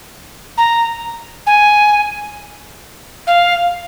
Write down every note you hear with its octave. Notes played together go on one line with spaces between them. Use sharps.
A#5
G#5
F5